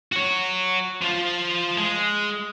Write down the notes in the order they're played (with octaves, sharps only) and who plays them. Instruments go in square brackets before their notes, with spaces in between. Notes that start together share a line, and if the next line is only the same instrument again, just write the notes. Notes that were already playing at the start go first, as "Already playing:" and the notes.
[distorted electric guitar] F#4 C#5
F3 F4
G#3